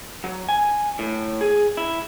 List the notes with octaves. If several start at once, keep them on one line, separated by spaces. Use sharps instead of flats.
F#3
G#5
A2
G#4
E4